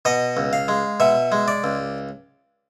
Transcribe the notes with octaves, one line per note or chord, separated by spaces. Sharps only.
B2 D#5
C#2
F5
G#3
B2 E5
G#3
D5
C#2